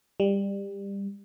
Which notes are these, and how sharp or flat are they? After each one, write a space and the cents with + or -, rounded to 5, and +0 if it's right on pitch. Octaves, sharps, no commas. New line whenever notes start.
G3 +20